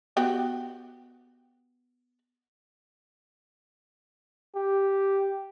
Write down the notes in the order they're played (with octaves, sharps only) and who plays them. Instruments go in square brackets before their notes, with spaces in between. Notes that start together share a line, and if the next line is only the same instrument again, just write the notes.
[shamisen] B3 F#4 G4
[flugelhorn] G4